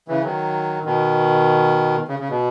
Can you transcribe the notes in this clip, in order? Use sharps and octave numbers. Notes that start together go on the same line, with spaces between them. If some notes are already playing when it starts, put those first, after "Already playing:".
C#3 E3
D#3 F#3
B2 D#3
C#3
C#3
B2